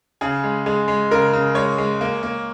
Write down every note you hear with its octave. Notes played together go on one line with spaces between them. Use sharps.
C#3 G#4
G#3
G#3 G#4
G#3
C#3 A#4
C#3
G#3 C#5
G#3
A#3
A#3